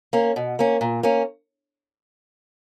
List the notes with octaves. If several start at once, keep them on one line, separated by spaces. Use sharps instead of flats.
A#3 C#4
B2
A#3 C#4
A#2
A#3 C#4